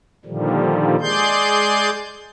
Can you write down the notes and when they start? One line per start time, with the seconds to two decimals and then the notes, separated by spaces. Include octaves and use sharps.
0.25 A#2 D3 D#3 F3 G3
1.01 G#3 G#4 D5 C6 G6